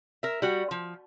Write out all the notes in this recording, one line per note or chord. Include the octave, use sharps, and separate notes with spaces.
A#4 E5
G3 F#4
F3